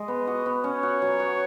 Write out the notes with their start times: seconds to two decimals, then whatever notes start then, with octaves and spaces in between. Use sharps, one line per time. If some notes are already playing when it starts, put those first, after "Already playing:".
Already playing: G#3 D#5
0.08 B3
0.27 F#4
0.46 B3
0.64 C#4 C#5
0.83 F#4
1.02 F#3
1.20 F#4